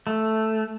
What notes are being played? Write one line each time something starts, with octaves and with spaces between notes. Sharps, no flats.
A3